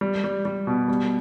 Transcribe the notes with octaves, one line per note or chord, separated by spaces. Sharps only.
G3
G3
G3
B2
G3